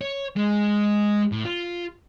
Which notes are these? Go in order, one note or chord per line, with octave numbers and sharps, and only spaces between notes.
C#5
G#3
A2
F4